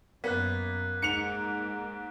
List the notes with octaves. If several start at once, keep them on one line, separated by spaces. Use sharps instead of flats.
F#2 A#3 B3 F#6 B6
G#2 G#3 A#3 C#7 F7